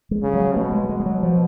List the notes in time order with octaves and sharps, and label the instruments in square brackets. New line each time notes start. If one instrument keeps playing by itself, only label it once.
[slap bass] G#3
[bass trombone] C#3
[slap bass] F#3
[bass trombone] B2 [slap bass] A3
[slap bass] G#3
G#3
G#3
F#3
F3